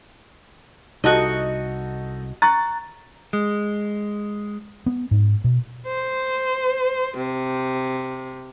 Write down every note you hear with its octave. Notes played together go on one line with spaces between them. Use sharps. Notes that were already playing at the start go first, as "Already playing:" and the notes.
C2 D#4 F#4 A4 D#5 A5
A#5 C#6 F#6 A6
G#3
B3
G#2
B2
C5
C3